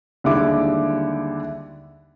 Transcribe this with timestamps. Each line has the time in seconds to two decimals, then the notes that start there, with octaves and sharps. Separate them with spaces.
0.24 D#2 D3 G3 G#3 E4 D6